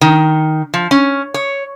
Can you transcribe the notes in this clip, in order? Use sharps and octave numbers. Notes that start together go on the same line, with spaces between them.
D#3
F3
C#4
C#5